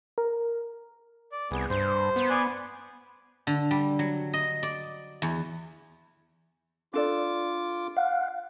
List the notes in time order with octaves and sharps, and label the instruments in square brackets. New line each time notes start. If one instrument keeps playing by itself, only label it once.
[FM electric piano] A#4
[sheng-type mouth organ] D5
[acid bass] C2 [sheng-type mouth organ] B3 G#4
[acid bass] G2 [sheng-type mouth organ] C5
[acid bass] B3
[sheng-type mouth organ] D5 G#5 C6
[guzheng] D3
G3
F#3
D#5
D5
E2
[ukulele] D4 A4 D5 [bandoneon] F4 D6
[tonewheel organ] F5 F#5